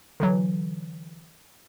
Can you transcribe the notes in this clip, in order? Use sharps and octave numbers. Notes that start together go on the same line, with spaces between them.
D3 E3 F#3